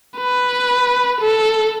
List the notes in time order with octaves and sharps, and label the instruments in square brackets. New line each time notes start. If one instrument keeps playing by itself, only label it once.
[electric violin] B4
A4